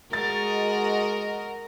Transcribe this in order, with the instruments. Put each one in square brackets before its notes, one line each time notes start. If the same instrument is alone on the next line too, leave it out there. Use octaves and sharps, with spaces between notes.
[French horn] G#3 [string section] F#4 D#5 [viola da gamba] A#4 [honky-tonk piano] A6